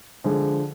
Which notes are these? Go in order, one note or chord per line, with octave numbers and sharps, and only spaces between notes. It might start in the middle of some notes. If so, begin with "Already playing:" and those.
D3 F3 G#3